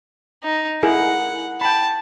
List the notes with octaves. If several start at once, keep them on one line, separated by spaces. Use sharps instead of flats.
D#4
E4 G#4 A#4 F#5
G5 A5 B5